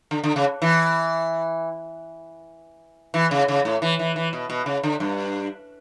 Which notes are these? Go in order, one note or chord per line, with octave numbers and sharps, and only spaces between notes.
D3
D3
C#3
E3
E3
C#3
C#3
A2
E3
E3
E3
B2
B2
C#3
D3
G2